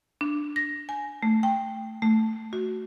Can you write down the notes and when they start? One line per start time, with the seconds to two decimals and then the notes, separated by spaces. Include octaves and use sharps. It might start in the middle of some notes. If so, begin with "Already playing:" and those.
0.21 D4
0.56 A#6
0.89 G#5
1.22 A3
1.43 G5
2.02 A3
2.53 F#4